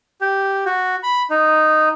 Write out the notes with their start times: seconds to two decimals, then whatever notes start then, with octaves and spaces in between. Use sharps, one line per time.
0.21 G4
0.66 F#4
1.03 B5
1.30 D#4